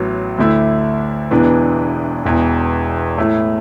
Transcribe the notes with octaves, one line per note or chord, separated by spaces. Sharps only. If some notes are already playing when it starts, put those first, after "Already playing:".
Already playing: A1 A2 F#3 B3
D2 D3 A3 E4
E1 E2 E3 B3 D4
E1 E2 E3
A2 A3 E4